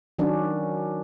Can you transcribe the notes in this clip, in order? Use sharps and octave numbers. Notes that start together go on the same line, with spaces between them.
D#3 F#3 C#4 D4